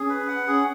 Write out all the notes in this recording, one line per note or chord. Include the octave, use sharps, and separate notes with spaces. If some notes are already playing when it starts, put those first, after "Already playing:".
Already playing: C#4 G#4
B4
F#5
C#4 G#4